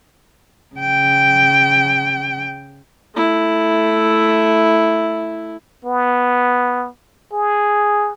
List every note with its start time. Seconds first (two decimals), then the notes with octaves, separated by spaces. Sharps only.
0.75 C#3 G5
3.16 A3 E4
5.85 B3
7.32 G#4